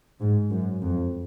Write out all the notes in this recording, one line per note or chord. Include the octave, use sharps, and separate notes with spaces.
G#2
F#2
F2